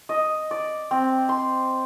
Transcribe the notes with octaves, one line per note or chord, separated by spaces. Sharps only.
D#5
D5
C4
C6